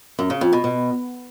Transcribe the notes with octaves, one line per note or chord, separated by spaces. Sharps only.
F#2
C#3
F2
B2
B2